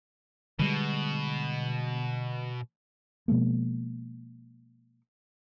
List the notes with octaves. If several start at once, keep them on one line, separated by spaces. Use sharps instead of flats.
B2 D3 G3 G#3
B2 F3 G#3 A#3